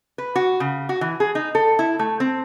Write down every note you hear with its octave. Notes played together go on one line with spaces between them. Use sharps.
B4
F#4
C#3
F#4
E3
G#4
D#4
A4
E4
A3
C4